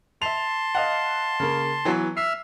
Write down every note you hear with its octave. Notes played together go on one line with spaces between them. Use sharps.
E5 A5 C6 F7
D#5 F5 F#5
C#3 A#3
E3 F#3 B3
E5 E6 F6 C7